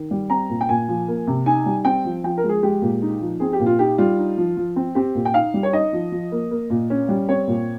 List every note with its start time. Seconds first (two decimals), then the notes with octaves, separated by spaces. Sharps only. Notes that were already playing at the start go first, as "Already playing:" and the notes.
Already playing: D#3
0.11 G3
0.30 C4 A#5
0.49 A#2
0.61 G5
0.69 A#2 G#5
0.89 F3
1.08 A#3
1.27 C3
1.46 D#4 G#5
1.66 G3
1.85 C4 G5
2.05 F3
2.24 F3 G5
2.37 A#4
2.44 G#3
2.49 G#4
2.63 G#3 G4
2.82 A#2
3.02 D#4
3.21 F3
3.40 C4 G#4
3.53 G4
3.60 A#2
3.66 F4
3.79 D#4 G4
3.98 G3 F4
4.19 D#4
4.38 F3
4.57 F3
4.76 C4
4.95 C4 G4
5.15 A#2
5.25 G5
5.34 D#4 F5
5.54 G3
5.63 C#5
5.73 D#4 D#5
5.93 F3
6.12 F3
6.32 A#3
6.51 A#3
6.70 A#2
6.90 C#4
7.09 G3
7.29 C4 C#5
7.47 A#2